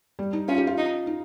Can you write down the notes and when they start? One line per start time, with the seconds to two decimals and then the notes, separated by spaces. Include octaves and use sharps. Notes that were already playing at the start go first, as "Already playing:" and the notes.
0.19 G3
0.33 D#4
0.48 C#4 F4
0.58 G4
0.67 F4
0.78 D#4
1.07 D#4